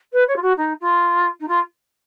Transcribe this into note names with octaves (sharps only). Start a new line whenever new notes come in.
B4
C#5
F4
F#4
D#4
F4
D#4
F4